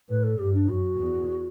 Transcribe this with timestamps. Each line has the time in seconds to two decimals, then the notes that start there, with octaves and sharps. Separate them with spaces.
0.09 A2 B4
0.23 A4
0.38 G2 G4
0.54 D4
0.69 F#2 F#4
0.99 E2